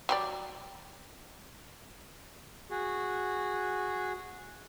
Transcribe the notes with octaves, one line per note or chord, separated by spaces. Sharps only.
F#3 G4 D5
F#4 G#4